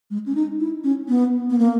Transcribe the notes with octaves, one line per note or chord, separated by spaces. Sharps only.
G#3
C#4
D#4
E4
C#4
B3
B3
A#3